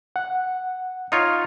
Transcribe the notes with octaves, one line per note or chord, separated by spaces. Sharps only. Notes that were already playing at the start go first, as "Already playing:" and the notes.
F#5
D#4 F4 C#5